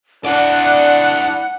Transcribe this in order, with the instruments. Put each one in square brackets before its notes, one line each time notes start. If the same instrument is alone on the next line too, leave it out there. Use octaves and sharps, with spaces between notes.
[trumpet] D4 [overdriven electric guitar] E4 D5 [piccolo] F#5